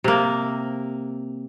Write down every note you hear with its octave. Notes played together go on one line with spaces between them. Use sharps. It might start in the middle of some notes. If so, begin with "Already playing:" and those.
C3 A#3